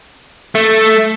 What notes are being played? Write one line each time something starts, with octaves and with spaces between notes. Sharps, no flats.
A3